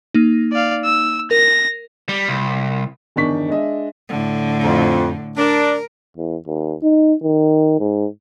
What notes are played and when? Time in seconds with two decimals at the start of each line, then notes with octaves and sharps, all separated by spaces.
0.14 A#3 D#4
0.52 D5 F5
0.85 E6
1.31 A#4 A#6
2.09 G3
2.28 C2
3.16 G1 E2 D#3 D4 C#6 B6
3.49 G#3 D4 D#5 E5
4.09 A2 D3
4.63 F2
5.37 D4 A#4
6.17 E2
6.47 D#2
6.83 D#4
7.23 D#3
7.79 G#2